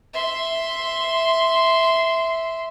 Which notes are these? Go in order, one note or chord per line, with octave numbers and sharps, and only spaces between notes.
E5 C6